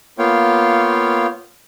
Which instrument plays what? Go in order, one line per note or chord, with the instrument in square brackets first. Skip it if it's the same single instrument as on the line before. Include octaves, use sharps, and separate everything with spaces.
[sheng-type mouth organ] A#3 B3 F4 C#5 F5 G5